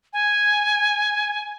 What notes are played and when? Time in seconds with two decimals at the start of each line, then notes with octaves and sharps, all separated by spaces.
0.13 G#5